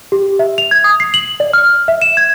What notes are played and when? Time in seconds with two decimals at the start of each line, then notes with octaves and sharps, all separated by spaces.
0.12 G4
0.39 E5
0.58 F7
0.71 G#6
0.84 D#6
1.00 C7
1.14 F#7
1.40 D5
1.53 F6
1.88 E5
2.02 E7
2.17 G#6